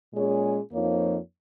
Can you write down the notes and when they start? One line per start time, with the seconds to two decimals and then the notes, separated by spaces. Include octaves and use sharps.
0.13 A#2 G#3 C#4 G#4 C#5
0.72 F2 F3 A#3 D#4 C#5